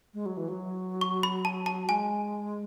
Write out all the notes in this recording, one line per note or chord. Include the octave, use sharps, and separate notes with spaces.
G#3
F#3
E3
F#3
C#6
B5
A5
A5
G#3 G#5